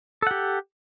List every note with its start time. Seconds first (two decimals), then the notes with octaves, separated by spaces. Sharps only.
0.22 A4
0.27 F#5
0.31 G4